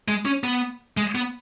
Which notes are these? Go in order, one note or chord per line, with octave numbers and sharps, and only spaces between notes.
G#3
C#4
B3
G#3
B3